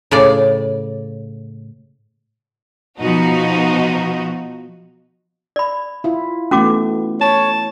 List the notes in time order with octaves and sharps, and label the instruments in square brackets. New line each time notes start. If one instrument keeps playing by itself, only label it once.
[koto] A2 C#3 D5
[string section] B2 F3 D#4 F#4
[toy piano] D5 B5
[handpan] E4 F4
[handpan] E3 A3 B3 [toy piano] C#4 F#4 D6
[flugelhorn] C#5 [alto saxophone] A5